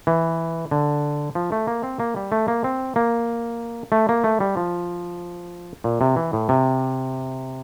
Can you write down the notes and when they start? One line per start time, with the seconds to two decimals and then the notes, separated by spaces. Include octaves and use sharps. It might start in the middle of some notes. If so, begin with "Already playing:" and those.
0.07 E3
0.71 D3
1.35 F3
1.52 A3
1.67 A#3
1.83 C4
2.00 A#3
2.16 G3
2.32 A3
2.48 A#3
2.64 C4
2.96 A#3
3.92 A3
4.09 A#3
4.24 A3
4.40 G3
4.57 F3
5.84 A#2
6.01 C3
6.16 E3
6.33 A2
6.49 C3